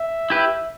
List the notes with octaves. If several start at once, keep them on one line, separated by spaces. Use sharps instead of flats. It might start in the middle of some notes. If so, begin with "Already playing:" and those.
Already playing: E5
E4 G4 B4